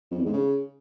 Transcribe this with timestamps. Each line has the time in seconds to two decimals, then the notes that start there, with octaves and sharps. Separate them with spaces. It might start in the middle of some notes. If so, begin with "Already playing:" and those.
0.11 F2
0.18 E2
0.26 G#2
0.33 C#3